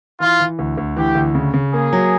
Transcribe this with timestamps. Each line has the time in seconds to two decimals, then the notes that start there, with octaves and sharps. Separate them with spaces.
0.20 E3 F4
0.40 E3
0.59 D2
0.77 D2
0.97 E3 G4
1.15 D2
1.35 C#3
1.54 C#3
1.73 A#3 G#4
1.93 F#3